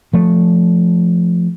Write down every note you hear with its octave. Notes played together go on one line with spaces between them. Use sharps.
F3 A3